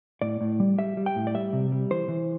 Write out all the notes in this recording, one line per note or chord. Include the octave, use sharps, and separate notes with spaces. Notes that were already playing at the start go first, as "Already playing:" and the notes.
A2 D5
A2
G3
G3 E5
G3
G5
A2
D5
G3 E5
C3
G3
E3 C5
E3